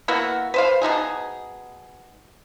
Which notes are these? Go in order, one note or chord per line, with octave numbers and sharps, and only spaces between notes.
A#3 B3 E4 F#4
B4 C5 F5
B2 G#3 D#4 G#4